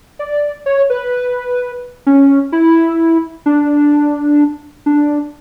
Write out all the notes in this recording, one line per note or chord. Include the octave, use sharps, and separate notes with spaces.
D5
C#5
B4
C#4
E4
D4
D4